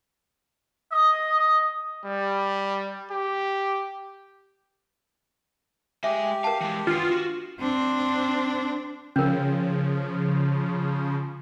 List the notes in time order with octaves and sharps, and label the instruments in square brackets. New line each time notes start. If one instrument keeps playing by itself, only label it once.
[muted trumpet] D#5 [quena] D#6
[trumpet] G3
G4
[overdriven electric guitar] G#3 G#5 [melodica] G4 [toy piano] E5
[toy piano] A#4 A5 [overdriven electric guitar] F5
[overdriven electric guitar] E3 G#3
[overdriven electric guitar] D#3 B3 [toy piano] D4 [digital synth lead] F4
[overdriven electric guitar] F#4
[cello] C4 D4
[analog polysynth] C#3 F3 [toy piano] C#4 A#4